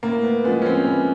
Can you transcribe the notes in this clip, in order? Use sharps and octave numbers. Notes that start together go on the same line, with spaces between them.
A2 A#3
B3
F3 G#3 B3
C#4
C4
A2 B3